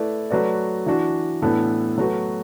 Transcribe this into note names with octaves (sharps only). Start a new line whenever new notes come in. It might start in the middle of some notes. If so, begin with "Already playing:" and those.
Already playing: A3 E4 B4 D5
F#3 A3 F#4 B4 D5
E3 D4 F#4
A2 E3 B3 D4 A4
F#3 A3 F#4 B4